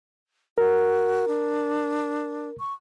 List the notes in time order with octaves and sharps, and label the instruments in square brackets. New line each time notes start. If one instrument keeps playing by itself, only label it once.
[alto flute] F#4 [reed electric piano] A#4
[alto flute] D4
C#6